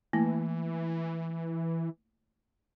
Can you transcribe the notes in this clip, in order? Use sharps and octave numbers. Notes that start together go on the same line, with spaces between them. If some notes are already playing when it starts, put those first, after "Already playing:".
E3 A3 A#3 E4